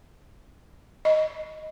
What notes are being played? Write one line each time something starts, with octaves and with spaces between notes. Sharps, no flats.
D#5